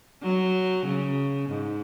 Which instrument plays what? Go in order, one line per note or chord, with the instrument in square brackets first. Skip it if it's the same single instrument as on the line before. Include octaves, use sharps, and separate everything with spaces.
[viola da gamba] F#3
C#3
G#2